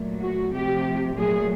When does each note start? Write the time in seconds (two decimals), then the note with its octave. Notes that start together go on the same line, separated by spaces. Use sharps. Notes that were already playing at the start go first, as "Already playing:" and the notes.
Already playing: A#2 F#3 A3
0.21 F#4
0.53 C3 F3 A3 G4
1.16 A#2 F#3 A3 G#4